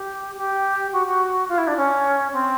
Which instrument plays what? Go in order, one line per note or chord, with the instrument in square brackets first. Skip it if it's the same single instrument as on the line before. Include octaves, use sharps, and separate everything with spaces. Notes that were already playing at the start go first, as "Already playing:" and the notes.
Already playing: [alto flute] G4
G4
F#4
F#4
F4
E4
D4
C#4
C4